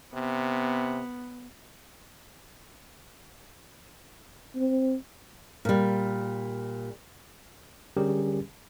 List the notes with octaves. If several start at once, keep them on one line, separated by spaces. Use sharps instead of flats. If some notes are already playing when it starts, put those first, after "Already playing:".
C3 B3
C4
A#2 G3
D3 G3 C#4 G4 G#4 A#4